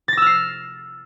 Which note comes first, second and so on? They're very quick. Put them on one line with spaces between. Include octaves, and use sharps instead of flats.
A6 A#6 E6 F6 C7